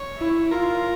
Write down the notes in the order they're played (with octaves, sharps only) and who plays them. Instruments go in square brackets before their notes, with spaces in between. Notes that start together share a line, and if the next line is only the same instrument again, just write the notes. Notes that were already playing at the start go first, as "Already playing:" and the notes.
Already playing: [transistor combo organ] C#5
[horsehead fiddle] E4
[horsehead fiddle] F4 [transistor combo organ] A#4